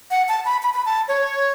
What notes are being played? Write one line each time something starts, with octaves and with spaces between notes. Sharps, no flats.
F#5
A5
B5
B5
B5
A5
C#5